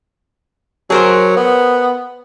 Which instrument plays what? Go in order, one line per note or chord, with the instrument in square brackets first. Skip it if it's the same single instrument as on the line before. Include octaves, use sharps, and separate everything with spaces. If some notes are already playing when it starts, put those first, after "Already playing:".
[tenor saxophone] F#3 [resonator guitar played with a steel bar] G#4 A#4 C5
[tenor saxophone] B3